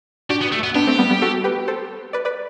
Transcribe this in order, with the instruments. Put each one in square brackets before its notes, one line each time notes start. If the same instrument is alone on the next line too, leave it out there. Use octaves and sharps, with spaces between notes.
[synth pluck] D4 F#4 [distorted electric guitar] G4
[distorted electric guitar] B3
A3
B3
[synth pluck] B3 D4 [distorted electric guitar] G4
[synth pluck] A3 C4
G3 B3
G3 B3
F#4 A4
G4 B4
A4 C5
B4 D5
B4 D5